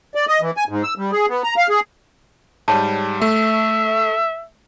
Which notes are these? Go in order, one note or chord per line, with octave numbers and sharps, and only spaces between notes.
D5
D#5
E3
G#5
G#2
E6
G3
G#4
B3
A#5
F5
G#4
G#2 G3 C#5 A5
A3 E5